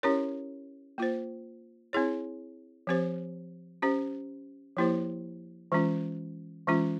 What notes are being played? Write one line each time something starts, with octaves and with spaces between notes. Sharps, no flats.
C#4 E4 G4 A#4 C#5
A#3 F4 C5
C4 E4 G#4 C#5
F3 C4 G4 C5
C#4 G4 C5
F3 A#3 E4 G4 C5
E3 G#3 C#4 F4
E3 G#3 C#4 F4